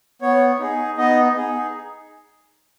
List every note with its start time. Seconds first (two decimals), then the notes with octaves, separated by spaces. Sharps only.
0.22 B3 C#5
0.60 D#4 G#4
0.97 B3 D#4 D#5
1.36 D#4 G#4